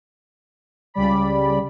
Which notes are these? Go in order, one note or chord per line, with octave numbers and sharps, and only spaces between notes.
C#2 C#3 G3 D5 B5